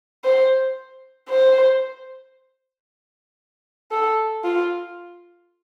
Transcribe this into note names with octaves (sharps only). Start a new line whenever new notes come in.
C5
C5
A4
F4